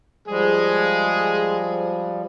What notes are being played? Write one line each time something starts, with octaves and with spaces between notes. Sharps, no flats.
F3 G3 G#3 G#4